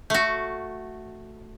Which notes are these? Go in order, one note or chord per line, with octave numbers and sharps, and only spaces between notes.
A3 F#4